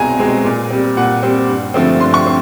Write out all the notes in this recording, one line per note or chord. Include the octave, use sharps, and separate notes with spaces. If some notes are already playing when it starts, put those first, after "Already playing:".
Already playing: C2 B2 G#3 C4 G#5 A#5
B2 G#3 C4
A#2
G3 C4
A#2 F#5
G3 C4
G2
D3 F3 A3 C4
G2 C6
C#6
C4